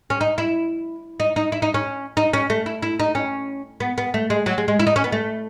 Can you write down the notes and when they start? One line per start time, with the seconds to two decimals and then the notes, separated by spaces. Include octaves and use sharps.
0.10 C#4
0.21 D#4
0.38 E4
1.20 D#4
1.36 D#4
1.52 E4
1.62 D#4
1.74 C#4
2.17 D#4
2.33 C#4
2.50 A3
2.66 E4
2.82 E4
3.00 D#4
3.15 C#4
3.80 B3
3.98 B3
4.14 A3
4.30 G#3
4.46 F#3
4.58 G#3
4.68 G#3
4.80 E4
4.87 D#4
4.96 C#4
5.04 B3
5.12 A3